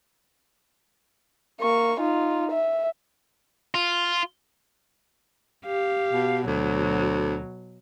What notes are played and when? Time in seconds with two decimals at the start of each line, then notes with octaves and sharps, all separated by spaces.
1.60 A#3 C#6
2.00 D#4 F4
2.52 E5
3.75 F4
5.65 G4 F5
6.13 B2
6.47 D2 B2 F#3